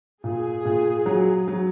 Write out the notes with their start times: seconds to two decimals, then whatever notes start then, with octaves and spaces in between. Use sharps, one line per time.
0.24 A#2 G#4
0.65 A#2
1.06 F#3
1.48 F#3